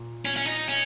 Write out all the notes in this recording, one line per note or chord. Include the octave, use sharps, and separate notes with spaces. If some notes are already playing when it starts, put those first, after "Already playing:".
Already playing: A#2 A#3
C#4
C#4
D#4
C#4